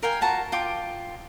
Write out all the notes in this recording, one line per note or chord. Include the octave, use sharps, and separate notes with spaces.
A#4 F5 G5 G#5
F4 F#4 A5 A#5
F4 G5 D6